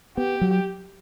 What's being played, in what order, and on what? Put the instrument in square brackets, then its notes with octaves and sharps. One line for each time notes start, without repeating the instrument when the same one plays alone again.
[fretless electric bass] B3 [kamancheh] G4
[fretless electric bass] F#3